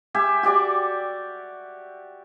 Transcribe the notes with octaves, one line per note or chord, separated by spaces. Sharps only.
G4 E5 G#5
F#4 G4 D5 D6